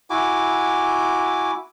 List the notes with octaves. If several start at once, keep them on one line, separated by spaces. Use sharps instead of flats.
E4 F#4 G#5 D6